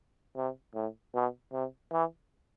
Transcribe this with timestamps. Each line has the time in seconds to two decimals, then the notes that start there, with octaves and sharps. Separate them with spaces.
0.37 C3
0.75 A2
1.15 B2
1.53 C3
1.92 E3